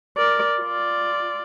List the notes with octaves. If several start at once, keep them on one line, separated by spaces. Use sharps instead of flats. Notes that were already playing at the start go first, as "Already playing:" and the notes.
A#4 D5
F4 D5